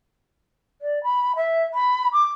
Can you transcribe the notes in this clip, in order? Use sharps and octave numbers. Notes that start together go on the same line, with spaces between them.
D5
B5
E5
B5
D6